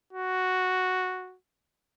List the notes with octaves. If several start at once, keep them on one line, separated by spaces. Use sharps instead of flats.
F#4